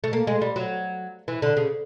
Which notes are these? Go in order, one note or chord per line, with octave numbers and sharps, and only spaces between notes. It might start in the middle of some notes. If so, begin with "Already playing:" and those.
A3
A#3
G#3
G3
F#3
E3
D3
C#3